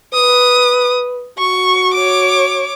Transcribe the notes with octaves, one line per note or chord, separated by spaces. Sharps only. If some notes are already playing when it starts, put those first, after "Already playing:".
B4 D#6
F#4 C#6
C#5 D6